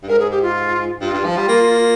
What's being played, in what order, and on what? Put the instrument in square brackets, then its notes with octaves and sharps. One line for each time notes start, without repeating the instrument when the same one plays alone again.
[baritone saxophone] G2
[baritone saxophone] G#2 [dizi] A#4
[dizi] G#4
G4
F4
[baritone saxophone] G2 [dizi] F4
[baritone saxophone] G2
F3
G3
A#3